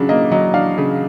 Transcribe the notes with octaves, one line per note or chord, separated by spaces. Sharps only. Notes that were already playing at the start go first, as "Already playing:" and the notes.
Already playing: C#3 F#3 D4
A#3 D#5
F#3 D#5
D4 F5
C#3